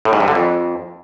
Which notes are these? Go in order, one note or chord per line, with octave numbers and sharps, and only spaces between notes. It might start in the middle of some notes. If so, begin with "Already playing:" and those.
A2
G#2
G2
D3
F2